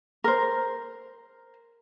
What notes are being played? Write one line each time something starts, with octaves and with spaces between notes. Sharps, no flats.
A#4 C5